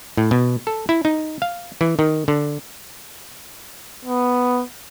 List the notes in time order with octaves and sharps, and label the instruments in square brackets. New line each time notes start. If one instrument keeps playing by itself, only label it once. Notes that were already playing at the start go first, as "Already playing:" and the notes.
[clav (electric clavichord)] A2
B2
A4
E4
D#4
F5
E3
D#3
D3
[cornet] B3